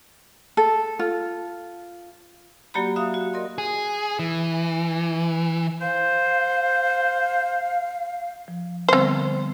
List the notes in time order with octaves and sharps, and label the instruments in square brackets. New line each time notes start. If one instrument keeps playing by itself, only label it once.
[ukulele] A4
F4
[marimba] F#3 A#3 F#4 G4 D5 B5
F#4 E5 F5 D#6
F#4
A#4 D5 D#5 C6
[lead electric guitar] G#4
E3
[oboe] C5 [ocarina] F5
[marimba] F3
[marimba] D3 G3 B3 [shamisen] C4 C5